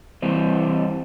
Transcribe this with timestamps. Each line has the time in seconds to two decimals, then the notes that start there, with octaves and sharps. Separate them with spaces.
0.22 E3 G3 C4